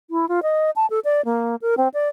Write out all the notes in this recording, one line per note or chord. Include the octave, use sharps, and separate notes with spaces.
E4
F4
D#5
A5
A4
D5
A#3
A#4
C4
D5